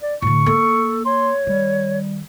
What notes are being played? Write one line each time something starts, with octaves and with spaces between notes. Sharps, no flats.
D5
A2 D3 C#6
A#3 A4
C#5 C6
D#3 G3